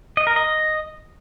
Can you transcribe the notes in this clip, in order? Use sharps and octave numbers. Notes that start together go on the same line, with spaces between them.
D#5
A#4
D#5